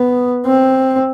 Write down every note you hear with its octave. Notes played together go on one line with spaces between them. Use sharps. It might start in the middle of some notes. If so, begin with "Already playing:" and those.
Already playing: B3
C4